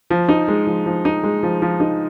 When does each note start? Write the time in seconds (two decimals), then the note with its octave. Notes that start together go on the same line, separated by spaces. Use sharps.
0.10 F3
0.29 D#4
0.48 G#3
0.67 F3
0.86 F3
1.05 D#4
1.24 G#3
1.43 F3
1.62 F3
1.80 D#4